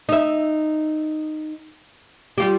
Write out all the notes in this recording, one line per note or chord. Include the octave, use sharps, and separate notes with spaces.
D#4 E5
G3 F4 G4